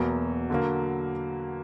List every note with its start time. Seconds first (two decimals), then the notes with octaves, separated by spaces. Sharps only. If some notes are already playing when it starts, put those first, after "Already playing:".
Already playing: E2 B2 F#3 A#3
0.50 D3 F#3 A#3